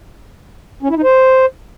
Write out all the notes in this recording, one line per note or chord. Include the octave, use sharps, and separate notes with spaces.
C#4
E4
D#4
C5